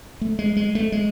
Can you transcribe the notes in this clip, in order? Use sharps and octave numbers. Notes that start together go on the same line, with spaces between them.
A3
G#3
G#3
A3
G#3